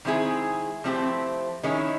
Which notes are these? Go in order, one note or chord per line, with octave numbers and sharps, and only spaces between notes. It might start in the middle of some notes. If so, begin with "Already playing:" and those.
D#3 G#3 C4 E4 G#4
F3 A3 C4 E4 G4
D#3 G#3 C#4 E4